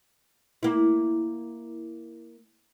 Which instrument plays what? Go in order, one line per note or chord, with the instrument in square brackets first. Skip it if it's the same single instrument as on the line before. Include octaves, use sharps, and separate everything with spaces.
[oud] A#3 E4